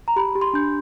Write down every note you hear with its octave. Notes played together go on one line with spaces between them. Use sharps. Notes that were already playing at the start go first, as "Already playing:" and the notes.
A#5
G4 B5
G4
C6
D4 G6